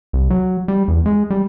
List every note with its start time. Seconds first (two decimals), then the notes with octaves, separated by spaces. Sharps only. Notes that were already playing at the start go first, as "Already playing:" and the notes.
0.13 C2
0.30 F#3
0.68 G3
0.88 E2
1.06 G#3
1.30 G3